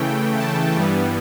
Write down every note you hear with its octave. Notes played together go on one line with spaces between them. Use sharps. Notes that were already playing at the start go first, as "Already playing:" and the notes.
Already playing: C#3 E3 A3 G5
A5
G2 E3 G3 B3